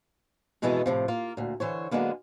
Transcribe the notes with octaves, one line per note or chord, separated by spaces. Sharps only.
F2 B2 E3 G#3 B3 A4
A2 C3 F3
A#3 F4
D2 A#2
D3 E3 C5 C#5
D3 F#3 G#3 A#3 B3